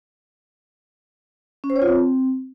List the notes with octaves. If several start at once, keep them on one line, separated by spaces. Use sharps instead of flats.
C#4
C5
C#5
F4
C4